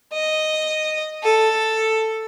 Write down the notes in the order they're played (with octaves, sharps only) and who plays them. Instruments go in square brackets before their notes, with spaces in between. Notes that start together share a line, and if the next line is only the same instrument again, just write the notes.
[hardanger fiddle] D#5
A4